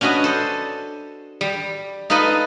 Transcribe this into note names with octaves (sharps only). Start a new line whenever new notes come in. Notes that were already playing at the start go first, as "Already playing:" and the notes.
C#4 D4 F#4 B4 D#5
A4 C5
G3
D#4 F4 A4 B4 D#5